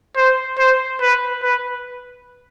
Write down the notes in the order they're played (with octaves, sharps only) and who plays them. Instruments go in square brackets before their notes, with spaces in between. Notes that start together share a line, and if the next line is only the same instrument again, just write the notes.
[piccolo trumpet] C5
C5
B4
B4